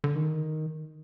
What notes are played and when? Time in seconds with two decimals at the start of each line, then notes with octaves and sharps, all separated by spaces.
0.04 D3
0.15 D#3